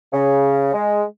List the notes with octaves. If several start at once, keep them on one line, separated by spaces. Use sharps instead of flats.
C#3
G#3